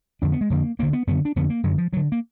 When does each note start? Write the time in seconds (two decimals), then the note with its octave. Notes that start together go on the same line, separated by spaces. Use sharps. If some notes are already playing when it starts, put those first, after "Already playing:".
0.22 F2 D3 D4
0.32 B3
0.41 G#3
0.50 F2 D3 A#3
0.79 D2 D3 A#3
0.93 B3
1.07 F#2 D3 B3
1.25 D4
1.36 F2 D3 B3
1.50 A#3
1.63 F#2 D3 F#3
1.78 F3
1.93 D2 F#3
1.97 D3
2.12 A#3